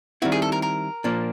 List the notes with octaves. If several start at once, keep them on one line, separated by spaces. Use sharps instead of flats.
D#3 G3 C4 E4 F#4
G#4
A4
A#4
A#4
A#2 F3 A#3 D4